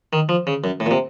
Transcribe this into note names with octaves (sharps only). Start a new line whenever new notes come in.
D#3
F3
C#3
F#2
A2
A#2
C3